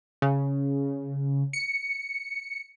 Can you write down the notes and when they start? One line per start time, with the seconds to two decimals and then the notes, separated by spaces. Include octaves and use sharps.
0.22 C#3
1.53 C#7